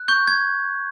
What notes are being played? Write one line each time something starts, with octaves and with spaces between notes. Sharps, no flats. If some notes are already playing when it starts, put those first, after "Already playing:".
Already playing: F#6
C#6 G6
G#6